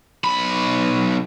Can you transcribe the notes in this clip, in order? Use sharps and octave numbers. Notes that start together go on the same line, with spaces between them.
B1 B5